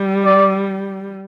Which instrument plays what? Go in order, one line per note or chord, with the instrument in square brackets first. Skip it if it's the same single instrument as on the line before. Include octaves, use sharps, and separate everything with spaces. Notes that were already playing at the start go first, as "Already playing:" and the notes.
Already playing: [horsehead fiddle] G3
[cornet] D5